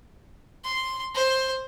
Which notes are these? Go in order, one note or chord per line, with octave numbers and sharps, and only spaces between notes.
C6
C5